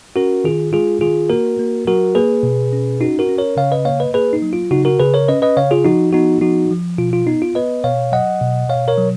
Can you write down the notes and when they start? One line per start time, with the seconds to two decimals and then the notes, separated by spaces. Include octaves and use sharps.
0.16 C#4 F#4 A#4
0.44 D#3 F4 G#4
0.73 G#3 F4 G#4
1.01 D#3 F4 G#4
1.30 A#3 F#4 A#4
1.59 A#3
1.87 F#3 F#4 A#4
2.15 A#3 G#4 B4
2.43 B2
2.73 C#4
3.00 C#4 D#4 F#4
3.19 F#4 A#4
3.29 C#4
3.38 A#4 C#5
3.57 C#3 C#5 F5
3.72 B4 D#5
3.85 A#3 C#5 F5
4.00 B4 D#5
4.14 A#3 G#4 B4
4.33 D#4
4.42 F#3
4.53 F4
4.71 C#3 D#4 F#4
4.85 F#4 A#4
5.00 C#3 G#4 B4
5.14 A#4 C#5
5.28 C#4 B4 D#5
5.42 B4 D#5
5.57 C#3 C#5 F5
5.71 F4 G#4
5.85 F3 D#4 F#4
6.13 B3 D#4 F#4
6.41 F3 D#4 F#4
6.71 F3
6.98 B2 F4
7.13 F4
7.27 B3 D#4
7.42 F4
7.55 B3 B4 D#5
7.84 B2 C#5 F5
8.12 F#3 D#5 F#5
8.41 B2
8.69 B2 C#5 F5
8.88 A#4 C#5
8.98 F#3